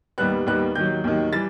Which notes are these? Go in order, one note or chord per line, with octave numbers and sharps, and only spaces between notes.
D#2 D#3 G3 B3 F#6
D#2 D#3 G3 B3 F#6
D#2 D#3 F#3 G6
D#2 D#3 F#3
E3 G3 A6